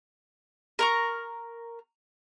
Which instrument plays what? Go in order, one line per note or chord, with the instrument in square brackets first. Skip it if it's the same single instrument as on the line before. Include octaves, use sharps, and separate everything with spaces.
[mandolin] A#4 A#5 C#6